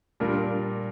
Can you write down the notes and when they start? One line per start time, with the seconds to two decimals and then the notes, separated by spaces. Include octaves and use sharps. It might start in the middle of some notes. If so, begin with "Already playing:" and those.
0.20 A#2 G3 D4 F4 A#4